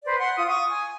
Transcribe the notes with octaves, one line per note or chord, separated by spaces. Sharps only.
B4 C5 D5
F#5 C6
F4 D#6
C#6 D#6
G#5